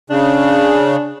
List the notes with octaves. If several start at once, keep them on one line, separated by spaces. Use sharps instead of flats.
C#3 D4